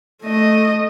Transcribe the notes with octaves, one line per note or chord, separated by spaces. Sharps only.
A3 D#5